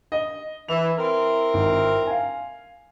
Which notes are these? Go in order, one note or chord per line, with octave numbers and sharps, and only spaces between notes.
D#5
E3 F7
C4 E4 A#4
G#1
F5 G#5